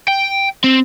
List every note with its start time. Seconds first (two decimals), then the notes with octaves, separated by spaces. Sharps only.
0.08 G5
0.64 C4